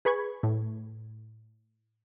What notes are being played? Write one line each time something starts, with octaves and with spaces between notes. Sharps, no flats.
G#4 B4 B5 C#6 G#6
A2